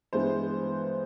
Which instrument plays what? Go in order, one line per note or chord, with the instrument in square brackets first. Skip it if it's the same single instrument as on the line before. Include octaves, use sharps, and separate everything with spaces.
[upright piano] G2 E3 G#3 B3 C5